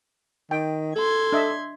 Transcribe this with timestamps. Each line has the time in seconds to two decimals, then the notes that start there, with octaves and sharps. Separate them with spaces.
0.51 D#3 G5
0.96 A4 C6 G#6
1.32 D4 D#5 E5